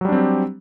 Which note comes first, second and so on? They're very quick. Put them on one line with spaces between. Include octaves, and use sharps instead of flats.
F#3 G3 D4 C4 G4